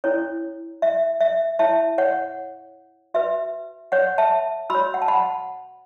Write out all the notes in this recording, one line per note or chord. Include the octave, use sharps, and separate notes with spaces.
C#4 E4 A4 C#5
E5
E5
E4 C#5 E5 A5
C#5 F#5
F#4 B4 E5
C#5 F#5
E5 A5
F#4 C#5 B5 E6
F#5
A5
F#5 B5